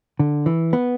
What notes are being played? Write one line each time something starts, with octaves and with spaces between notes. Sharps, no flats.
D3
E3
B3